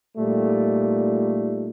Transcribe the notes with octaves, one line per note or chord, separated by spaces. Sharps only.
A#2 G3 A3 D#4